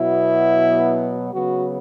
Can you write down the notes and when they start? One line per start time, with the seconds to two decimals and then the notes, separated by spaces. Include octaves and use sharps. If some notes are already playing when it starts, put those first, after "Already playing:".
Already playing: B2 F#3 B3 E4
1.32 C#3 F#3 B3 F#4